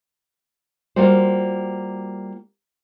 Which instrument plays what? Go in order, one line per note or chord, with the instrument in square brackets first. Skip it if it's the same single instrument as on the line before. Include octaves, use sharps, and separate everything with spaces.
[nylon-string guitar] G3 A#3 F4 F#4 C5